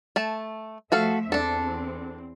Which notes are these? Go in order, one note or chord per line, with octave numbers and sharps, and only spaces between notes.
A3 A5
F3 A3 F#4 A4 E5 F5
E2 C4 D4 A4